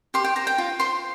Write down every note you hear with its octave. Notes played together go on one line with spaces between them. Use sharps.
G4 C6
G5
C5 A#5
G5
F4
C5 C6